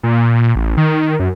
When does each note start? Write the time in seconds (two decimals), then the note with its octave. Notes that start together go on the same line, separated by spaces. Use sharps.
0.03 A#2
0.55 A1
0.77 D#3
1.20 F#2